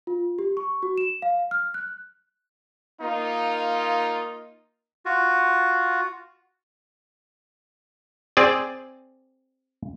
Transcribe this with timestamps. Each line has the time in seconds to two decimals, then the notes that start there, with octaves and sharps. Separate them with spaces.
0.07 F4
0.39 G4
0.57 C#6
0.83 F#4
0.98 E7
1.22 F5
1.51 F6
1.74 F#6
3.01 A#3 D#4 F4
5.05 F4 F#4
8.37 C4 G#4 D5